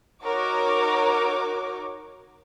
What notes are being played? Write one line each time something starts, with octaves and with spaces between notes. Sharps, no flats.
D#4 F#4 A#4 C#5 D6